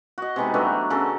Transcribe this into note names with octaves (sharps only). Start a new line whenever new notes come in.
F#4 D#5
C3 G#3 B3 D#4
E3 F#3 A3 D4
C#3 F#3 A4 A#4